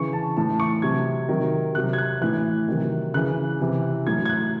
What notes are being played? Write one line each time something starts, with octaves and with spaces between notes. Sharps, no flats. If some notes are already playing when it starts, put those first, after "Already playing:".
Already playing: C#3 E3 C#6
A5
A2 E3 A5
C#6
C3 F#3 G#6
C3 D#3 F#3
C3 F#3 F#6
G#6
F#6
A2 E3 F#6
C3 D#3 F#3
C#3 E3 F#6
C3 E3
A2 F#3 G#6
G#6
F#6